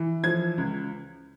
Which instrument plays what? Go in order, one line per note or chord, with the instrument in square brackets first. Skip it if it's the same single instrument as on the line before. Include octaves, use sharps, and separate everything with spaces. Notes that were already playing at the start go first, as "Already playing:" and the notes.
Already playing: [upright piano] E3
F3 G#6
C#2